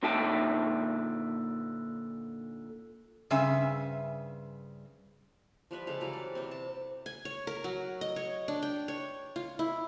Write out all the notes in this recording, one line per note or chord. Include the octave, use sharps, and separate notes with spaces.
A#2 D3 D#4 E5 G5 A5
G2 C#3 C4 E5 G#5
F3 G3 B4 E5
C#3 G#3 A4 F5
E3 F#3 G3 F5
D5
C3 C4
A5
G#5
C#5
A#4
F#3
D#5
C#5
D4
G5
C#5
F4
E4